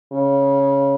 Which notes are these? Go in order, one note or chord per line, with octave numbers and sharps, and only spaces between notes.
C#3